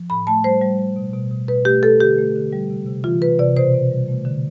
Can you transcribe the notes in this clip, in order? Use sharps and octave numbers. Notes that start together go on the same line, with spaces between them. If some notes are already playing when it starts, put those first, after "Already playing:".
Already playing: F3
A2 B5
A3 A5
G3 C5
G3
G3
B2
B2
B2
B2 B4
A3 G4
A3 A4
D3 G4
A3
D3
G3
C3
C3
E3 F4
C3 B4
C3 D5
B2 C5
B2
G3
A3
D3